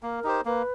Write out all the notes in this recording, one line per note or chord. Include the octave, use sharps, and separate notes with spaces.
A#3 A#4
D#4 G4 C5
A#3 B4